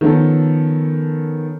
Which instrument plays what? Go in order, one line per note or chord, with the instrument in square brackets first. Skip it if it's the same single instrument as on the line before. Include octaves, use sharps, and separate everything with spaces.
[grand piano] D#3 F3 B3 C#4 A4